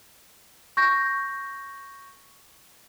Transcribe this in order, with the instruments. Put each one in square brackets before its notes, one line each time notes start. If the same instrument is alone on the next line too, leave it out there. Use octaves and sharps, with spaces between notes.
[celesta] C#6 G6 A#6